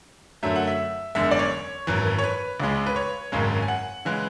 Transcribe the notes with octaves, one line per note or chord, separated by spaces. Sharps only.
F#2 D3 F#3 A3 E5
F#5
E5
F#1 E2 D3 G#3 E5
D5
C#5
G#1 F#2 E3
C#5
B4
C#2 C#3 G#3
B4
C#5
G#1 F#2 C#3 G#3
G#5
F#5
C#3 E3 G#3